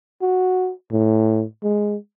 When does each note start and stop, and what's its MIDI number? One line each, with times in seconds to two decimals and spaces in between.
0.22 0.71 66
0.92 1.44 45
1.63 1.96 56